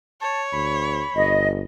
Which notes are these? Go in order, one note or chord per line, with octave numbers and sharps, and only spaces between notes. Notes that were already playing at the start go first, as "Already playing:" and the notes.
C#5 A5
D2 B5
G1 D#5